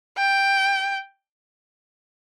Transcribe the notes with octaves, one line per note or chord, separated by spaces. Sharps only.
G5